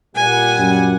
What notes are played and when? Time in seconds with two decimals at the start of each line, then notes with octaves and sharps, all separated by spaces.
0.16 A#2 G3 F#5 G#5
0.58 F#2